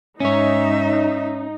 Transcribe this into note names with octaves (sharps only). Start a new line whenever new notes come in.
G#2 C#4 D#4 C#5 E5